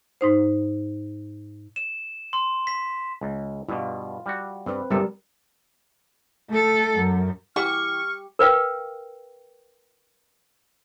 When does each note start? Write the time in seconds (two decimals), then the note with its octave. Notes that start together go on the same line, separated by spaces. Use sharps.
0.21 G#2 D#4 C5
1.76 E7
2.33 C6
2.67 B6
3.21 C#2
3.69 G2 B2 F4
4.26 G3 F#4
4.66 G2 C4 B4
4.90 G1 C3 G3 A4 A#4
6.49 A3 A4
6.97 F#2
7.56 E3 F#4 G4 C#6 F6
8.39 A#4 B4 F5 G5